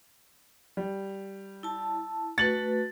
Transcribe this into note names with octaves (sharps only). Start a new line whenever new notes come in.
G3
E4 A5
A3 F#4 B4 A6 F#7